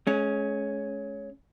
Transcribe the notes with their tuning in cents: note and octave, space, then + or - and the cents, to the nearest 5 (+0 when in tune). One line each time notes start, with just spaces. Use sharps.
G#3 +35 C#4 +0